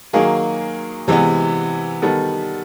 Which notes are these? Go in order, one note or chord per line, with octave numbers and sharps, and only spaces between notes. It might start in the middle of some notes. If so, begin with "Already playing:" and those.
D#3 F#3 A#3 G#4
C3 E3 G#3 B3
D#3 G3 B3 A4